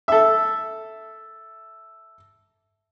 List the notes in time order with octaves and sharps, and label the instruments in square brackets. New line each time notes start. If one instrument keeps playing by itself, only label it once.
[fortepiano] A4 E5